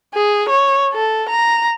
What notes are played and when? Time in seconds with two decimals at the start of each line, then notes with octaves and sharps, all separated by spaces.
0.15 G#4
0.49 C#5
0.94 A4
1.29 A#5